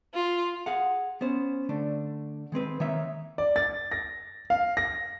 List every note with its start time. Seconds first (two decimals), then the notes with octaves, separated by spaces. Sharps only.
0.14 F4
0.66 G#4 F5 F#5
1.21 B3 C#4 C5
1.69 D3 A3 D4
2.52 D#3 G#3 C4 B4
2.80 D#3 A#3 D#4 C#5 E5
3.38 D5
3.56 A6
3.92 A#6
4.50 F5
4.77 A#6